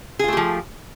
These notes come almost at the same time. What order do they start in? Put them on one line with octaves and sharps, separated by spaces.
G#4 F4 A3 G4 F3